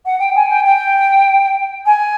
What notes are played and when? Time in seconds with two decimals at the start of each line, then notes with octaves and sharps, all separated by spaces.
0.05 F#5
0.19 G5
0.35 G#5
0.49 G5
0.65 G5
1.85 G#5